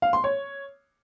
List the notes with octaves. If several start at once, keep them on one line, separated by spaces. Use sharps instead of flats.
F5
C6
C#5